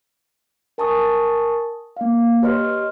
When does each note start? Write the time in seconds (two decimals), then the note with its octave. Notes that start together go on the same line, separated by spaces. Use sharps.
0.78 A#4 G#5 A5 C#6 D#6
1.97 A#3 F5
2.42 G4 B4 C#5 D#5 C6 F6